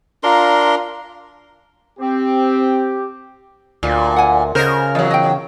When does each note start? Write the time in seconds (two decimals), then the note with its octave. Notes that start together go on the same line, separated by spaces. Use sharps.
0.23 D4 F4 A#4 A#5 C6
2.00 C4 G4
3.83 D2 A#2
4.16 F#5 G#5
4.55 C#3 A#4 C5 D#5
4.95 E2 F#3
5.11 D#5 G5